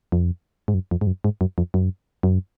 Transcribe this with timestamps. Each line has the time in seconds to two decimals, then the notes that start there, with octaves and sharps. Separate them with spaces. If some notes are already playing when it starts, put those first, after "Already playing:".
0.12 F2
0.68 G#2
0.74 F#2
0.91 F2
1.01 G#2
1.07 F#2
1.24 G#2
1.41 F#2
1.58 F2
1.74 F#2
2.23 F#2